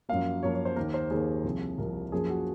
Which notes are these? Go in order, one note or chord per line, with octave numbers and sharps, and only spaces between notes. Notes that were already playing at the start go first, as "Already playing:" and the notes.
F#2 F3 A#3 F5
F#2 F3 A#3 C#5
C#5
C5
D#2 D#3 A#3 A#4
C5
D#2 D#3 A#3 G#4
C2 C3 F3
C2 C3 F3 A#4
F#2 F3 A#3 G#4
F#4